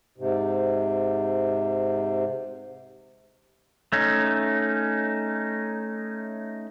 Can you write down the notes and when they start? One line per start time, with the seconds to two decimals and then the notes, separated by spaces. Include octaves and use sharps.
0.18 G#2 C3
3.92 A3 C#4 D#4